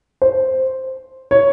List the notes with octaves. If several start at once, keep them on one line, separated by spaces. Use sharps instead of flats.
C5
C#5